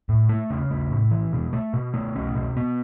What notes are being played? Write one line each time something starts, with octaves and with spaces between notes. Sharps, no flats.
A2
A3
C#3
A3
A2
E3
B2
A3
B2
A3
C#4
B2
B3